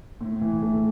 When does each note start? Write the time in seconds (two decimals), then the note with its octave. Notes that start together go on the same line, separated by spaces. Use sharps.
0.21 A2
0.41 E3
0.62 A3